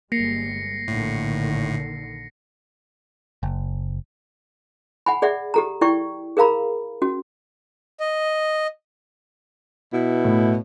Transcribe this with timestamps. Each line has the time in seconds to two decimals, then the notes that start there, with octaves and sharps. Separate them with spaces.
0.12 G1 G3 G#3 A#3 A#6 C7 C#7
0.88 A#1 A2 D3 D#3
3.43 F#1
5.06 F#5 G#5 B5
5.22 G#4 D5 E5 F#5
5.54 G4 A4 A#5
5.81 E4 D5 G5 C#6
6.37 G#4 A#4 F5 A#5 B5
7.02 C#4 F#4
8.00 D#5
9.93 B2 E4
10.25 A2